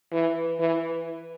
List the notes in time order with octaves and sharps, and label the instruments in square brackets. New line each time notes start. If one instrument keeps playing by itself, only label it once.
[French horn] E3
E3